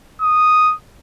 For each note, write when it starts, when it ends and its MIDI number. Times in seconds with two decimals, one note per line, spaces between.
0.22 0.74 87